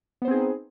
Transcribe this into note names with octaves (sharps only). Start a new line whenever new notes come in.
B3 C4 D#4 G#4 C5